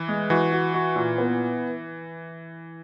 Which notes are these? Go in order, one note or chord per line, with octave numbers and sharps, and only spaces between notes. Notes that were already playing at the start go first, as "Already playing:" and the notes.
Already playing: E3
G#3
E3 F#4
F#4
F#4
A#2
B3